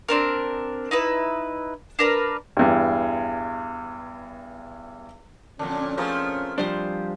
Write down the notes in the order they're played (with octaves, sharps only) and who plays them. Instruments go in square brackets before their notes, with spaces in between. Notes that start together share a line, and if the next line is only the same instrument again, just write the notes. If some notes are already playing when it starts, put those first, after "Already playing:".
[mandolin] C4 D4 A#4
D#4 E4 B4
D4 A#4 B4
[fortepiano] E2 G2
[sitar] F2 A#2 D3 [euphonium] C#4 [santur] D4
[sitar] F3 A3 A#4 [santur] C4 F4 G#4
[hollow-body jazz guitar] F3 G3 D4 [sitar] C5